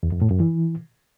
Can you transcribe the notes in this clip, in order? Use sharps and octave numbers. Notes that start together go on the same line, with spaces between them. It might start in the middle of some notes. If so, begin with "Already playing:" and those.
E2
F2
A2
F#2
E3